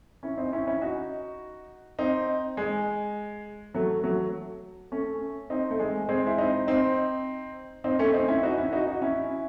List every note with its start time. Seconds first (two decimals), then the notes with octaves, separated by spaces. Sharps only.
0.23 C#4 E4
0.37 C4 D#4
0.53 C#4 E4
0.67 C#4 E4
0.82 D#4 F#4
1.99 C4 D#4
2.57 G#3
3.74 F#3 A3
4.04 F#3 A3
4.92 A3 C#4
5.50 C4 D#4
5.70 A3
5.79 G#3
6.09 G#3 C4
6.26 E4
6.38 C4 D#4
6.67 C4 D#4
7.84 C4 D#4
7.99 A3 C#4
8.14 C4 D#4
8.28 C#4 E4
8.43 D#4 F#4
8.58 C#4 E4
8.72 D#4 F#4
8.86 D#4 F#4
9.02 C#4 E4